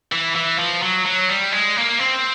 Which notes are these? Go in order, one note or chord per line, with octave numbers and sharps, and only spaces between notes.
E3
E3
F3
F#3
F#3
G3
G#3
A#3
C4